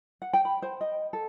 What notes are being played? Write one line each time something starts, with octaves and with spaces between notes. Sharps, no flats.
F#5
G5
B5
C5
D#5
A4